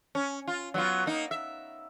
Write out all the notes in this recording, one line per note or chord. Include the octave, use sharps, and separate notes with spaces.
C#4
F4
F#3 B3 F4
A#3 D#4
E5